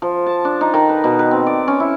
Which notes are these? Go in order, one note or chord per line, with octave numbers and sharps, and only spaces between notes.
F3
A5
D4
D#4
D#3
B4
B2
B4
C4
D5
C#4
E4